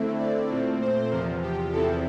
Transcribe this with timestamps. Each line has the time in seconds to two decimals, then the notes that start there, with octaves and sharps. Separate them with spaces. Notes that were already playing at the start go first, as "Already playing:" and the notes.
Already playing: D3 A3 C4 E4
0.19 D5
0.50 A#2 A3 C4
0.81 C5
1.11 E2 C3 F3 A#4
1.42 G4
1.72 E2 C3 F3 C4 E4 A4